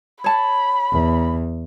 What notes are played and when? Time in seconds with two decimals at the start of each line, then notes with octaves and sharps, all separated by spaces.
0.24 C#5 A5 B5
0.92 E2